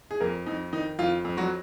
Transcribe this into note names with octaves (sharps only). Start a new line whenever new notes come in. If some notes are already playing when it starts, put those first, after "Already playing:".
G#4
F2 A#3 A#4
F2 D#4
D#3 D#4
F2 F4
F2
F#3 F#4